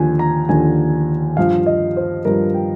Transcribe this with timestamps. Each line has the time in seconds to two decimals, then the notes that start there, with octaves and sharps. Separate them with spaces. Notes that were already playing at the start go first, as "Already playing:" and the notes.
Already playing: D#2 D3 F3 G#5
0.19 A#5
0.49 D#2 D3 F3 G#5
1.37 G2 F3 F5
1.66 D#5
1.97 C5
2.25 G2 F3 A#4
2.54 G5